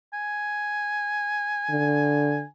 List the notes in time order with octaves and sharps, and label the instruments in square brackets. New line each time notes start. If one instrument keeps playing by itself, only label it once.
[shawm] G#5
[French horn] D3